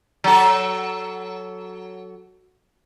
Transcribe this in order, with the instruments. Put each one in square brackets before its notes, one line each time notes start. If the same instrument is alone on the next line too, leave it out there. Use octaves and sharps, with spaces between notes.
[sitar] F#3 A4